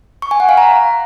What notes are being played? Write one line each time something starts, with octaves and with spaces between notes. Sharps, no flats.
C#6
G#5
F#5
F5
A#5